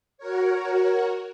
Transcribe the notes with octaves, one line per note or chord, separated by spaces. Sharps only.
F#4 A#4 C#5